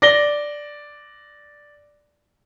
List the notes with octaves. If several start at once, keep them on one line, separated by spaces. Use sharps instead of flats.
D5 A#6 G7